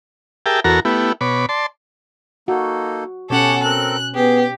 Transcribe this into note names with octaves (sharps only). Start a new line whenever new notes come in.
G4 G#4 A#4 E5 G5 A5
E2 F#4 A4 A#4 A#5
A3 B3 E4 G4
B2 C#5 B5 D6
D5 A5 C6
A#3 D#4 F#4 A4
B2 C#4 G4 A4 C#5 F#5
C4 A4 A#4 F#6
B3 G4 G#4